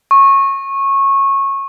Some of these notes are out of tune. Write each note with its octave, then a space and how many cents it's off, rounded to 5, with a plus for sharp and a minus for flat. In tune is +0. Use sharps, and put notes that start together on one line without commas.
C#6 -20